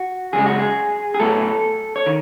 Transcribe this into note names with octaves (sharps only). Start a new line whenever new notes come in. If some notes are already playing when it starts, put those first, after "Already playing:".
Already playing: F#4
F#2 C#3 G#3 G#4
F#4
G#4
G#4
A2 F#3 B3 A4
C#5
D#3